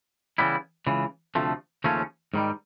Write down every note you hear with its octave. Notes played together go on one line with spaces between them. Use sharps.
C#3 E3 G3 B3 E4
C#2 C#3 E3
D2 C3 F3 A3
D#2 C#3 F3 A3 C#4
G#2 D#3 G3